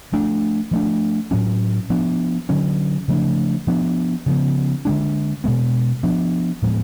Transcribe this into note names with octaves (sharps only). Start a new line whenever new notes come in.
F3 A3 D4
F3 A3 D4
A2 F#3 C#4
F3 B3 D4
D3 F#3 C#4
C#3 F3 A3 D4
F3 B3 D4
C#3 F3 B3
D3 G#3 D4
B2 G#3 B3
F3 B3 D4
A2 F3 G#3 B3